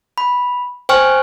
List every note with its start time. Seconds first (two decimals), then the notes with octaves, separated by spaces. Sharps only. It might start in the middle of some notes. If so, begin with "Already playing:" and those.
0.18 B5
0.89 C5 G5 G#5 C#6 F6